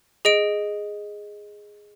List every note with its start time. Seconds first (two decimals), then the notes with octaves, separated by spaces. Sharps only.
0.25 G#4 D#5 D7